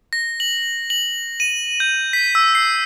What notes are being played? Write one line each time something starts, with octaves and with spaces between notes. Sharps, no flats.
A#6
F#7
F#7
D#7
G6
B6
E6
C7